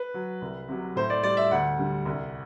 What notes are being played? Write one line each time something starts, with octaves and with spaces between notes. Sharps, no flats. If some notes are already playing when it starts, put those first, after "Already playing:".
Already playing: B4
F#3
C2
C3 F#3
A2 C5
D5
G3 D5
E5
D2 F#5
D3 G3
C2